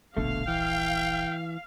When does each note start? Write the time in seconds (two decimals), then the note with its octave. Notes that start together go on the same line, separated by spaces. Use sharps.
0.17 D#1 A#1 B2 D3 A3 F5
0.48 E3 G5